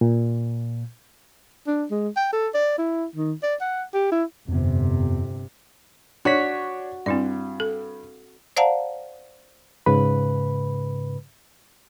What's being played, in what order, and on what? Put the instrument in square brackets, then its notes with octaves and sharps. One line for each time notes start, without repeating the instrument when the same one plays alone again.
[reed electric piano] A#2
[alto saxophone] D4
G#3
G5
A4
D5
E4
D#3
D5
F#5
G4
E4
[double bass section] G1 C3 [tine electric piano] F2 B3
[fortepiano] D4 C#5 [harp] F#4 B6
[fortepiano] G2 [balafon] C4 E4 D5
[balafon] A4
[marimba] C5 D5 F5 F#5 A5 A#5
[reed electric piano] G#2 C#3 B4 B5